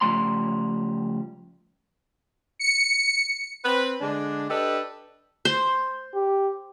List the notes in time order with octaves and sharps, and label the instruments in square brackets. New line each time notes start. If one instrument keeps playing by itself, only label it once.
[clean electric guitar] C#3 F3 G3 A3 A#5 C6
[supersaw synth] C#7
[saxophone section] C4 B4
D3 G#3 D4
D4 G4 A4 B4 D#5
[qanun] C5
[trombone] G4